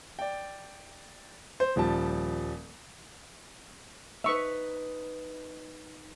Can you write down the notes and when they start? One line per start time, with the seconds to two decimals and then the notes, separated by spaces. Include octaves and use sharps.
0.19 D5 G5
1.60 C5
1.76 D#1 F3 G3 A5
4.24 D#4 B4 E5 C#6